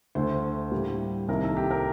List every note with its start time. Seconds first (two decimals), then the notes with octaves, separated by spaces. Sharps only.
0.15 D2 D3 A3 C5
0.72 A2 G3 A#3
1.28 C2 C3 D#3 A#3 A#4
1.43 A4
1.56 G4
1.71 A#4